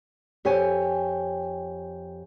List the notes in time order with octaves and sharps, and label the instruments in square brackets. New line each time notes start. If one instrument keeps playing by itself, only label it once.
[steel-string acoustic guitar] F2 G4 C#5 G#5